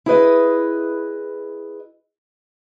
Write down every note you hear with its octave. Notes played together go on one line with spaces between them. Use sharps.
E4 G#4 B4 D#5